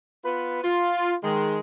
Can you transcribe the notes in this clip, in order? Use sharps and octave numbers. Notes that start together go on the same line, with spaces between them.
B3 F4 B4
F4
D#3 G#3